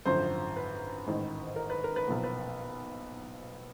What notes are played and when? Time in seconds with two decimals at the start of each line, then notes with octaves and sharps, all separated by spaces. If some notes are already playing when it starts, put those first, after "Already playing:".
0.05 G#1 F#2 D3 F3 C5
0.56 B4
1.07 A1 G#2 D#3
1.56 A#4
1.70 B4
1.84 A#4
1.96 B4
2.07 B1 A#2 F3 A#4
2.24 B4